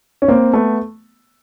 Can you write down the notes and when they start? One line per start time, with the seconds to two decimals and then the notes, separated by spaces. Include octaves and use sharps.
0.22 C#4
0.28 A#3 C4
0.53 A3 B3